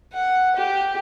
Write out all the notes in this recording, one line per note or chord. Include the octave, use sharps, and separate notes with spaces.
F#5
G4